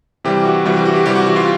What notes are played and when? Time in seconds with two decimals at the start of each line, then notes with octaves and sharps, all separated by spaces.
0.24 C3 E3 G3 G4
0.45 F#4
0.65 C3 E3 G3 F#4
0.76 G4
0.85 F#4
0.96 G4
1.06 C3 E3 G3 G4
1.16 F#4
1.26 F#4
1.36 F4